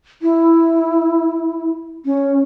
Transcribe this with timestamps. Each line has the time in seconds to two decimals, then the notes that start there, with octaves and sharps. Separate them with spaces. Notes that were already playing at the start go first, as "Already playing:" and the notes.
0.22 E4
2.05 C#4